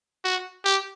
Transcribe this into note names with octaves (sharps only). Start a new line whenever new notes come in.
F#4
G4